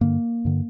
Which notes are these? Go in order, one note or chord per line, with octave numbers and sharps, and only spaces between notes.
G2 D3 A#3
G2 D3